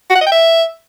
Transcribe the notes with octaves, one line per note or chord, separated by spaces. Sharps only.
F#4
F#5
D#5
G5
E5